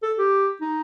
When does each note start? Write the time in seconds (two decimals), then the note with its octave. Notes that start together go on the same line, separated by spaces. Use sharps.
0.03 A4
0.18 G4
0.61 D#4